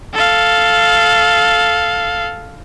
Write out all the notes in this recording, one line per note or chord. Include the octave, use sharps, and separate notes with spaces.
A4 F5